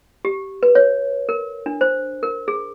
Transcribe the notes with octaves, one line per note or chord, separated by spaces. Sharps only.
G4
B4
C#5
A#4
D4
C5
A#4
G#4